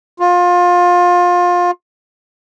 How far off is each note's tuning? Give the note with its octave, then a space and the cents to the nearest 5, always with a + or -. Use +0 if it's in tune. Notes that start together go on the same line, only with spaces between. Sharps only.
F4 +25